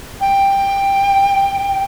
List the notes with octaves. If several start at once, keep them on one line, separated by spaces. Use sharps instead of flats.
G5